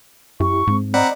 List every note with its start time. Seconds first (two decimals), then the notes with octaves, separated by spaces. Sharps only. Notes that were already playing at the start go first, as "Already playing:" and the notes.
0.40 F#2 E4 G4 C#6
0.67 G#2 G#3 C4
0.94 C4 D5 D#5 F#5 A#5 B5